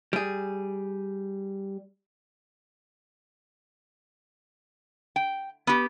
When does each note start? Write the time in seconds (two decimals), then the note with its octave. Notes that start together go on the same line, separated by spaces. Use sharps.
0.13 G3 G#4
5.16 G5
5.67 B3 G4